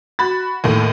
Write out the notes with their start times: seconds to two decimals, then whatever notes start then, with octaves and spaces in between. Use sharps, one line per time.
0.19 F#4 B5 A6
0.64 D#2 A2